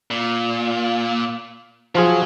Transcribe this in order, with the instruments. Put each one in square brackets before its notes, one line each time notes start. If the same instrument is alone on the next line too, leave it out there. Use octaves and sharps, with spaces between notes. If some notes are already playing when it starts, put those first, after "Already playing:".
[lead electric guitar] A#2
[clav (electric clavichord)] F3 F4 G#4 [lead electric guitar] F#3